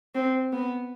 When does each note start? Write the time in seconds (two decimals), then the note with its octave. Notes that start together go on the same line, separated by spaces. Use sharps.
0.15 C4
0.52 B3